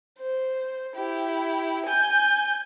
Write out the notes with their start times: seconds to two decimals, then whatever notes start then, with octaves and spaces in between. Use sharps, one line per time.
0.19 C5
0.96 E4 G4
1.86 G#5 G6